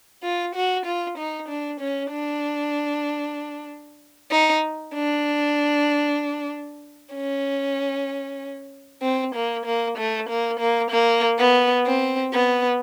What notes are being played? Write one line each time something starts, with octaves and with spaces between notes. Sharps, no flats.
F4
F#4
F4
D#4
D4
C#4
D4
D#4
D4
C#4
C4
A#3
A#3
A3
A#3
A#3
A#3
B3
C4
B3